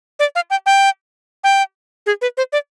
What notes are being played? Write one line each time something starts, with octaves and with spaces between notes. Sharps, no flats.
D5
F5
G5
G5
G5
G#4
B4
C5
D5